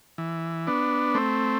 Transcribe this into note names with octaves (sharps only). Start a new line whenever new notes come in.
E3
B3 D4
A3 C4